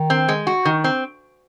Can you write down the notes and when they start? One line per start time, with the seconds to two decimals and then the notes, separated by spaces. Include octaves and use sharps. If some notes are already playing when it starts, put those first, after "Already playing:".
Already playing: D#3
0.10 C4
0.28 G#3
0.47 F#4
0.65 D#3
0.84 C4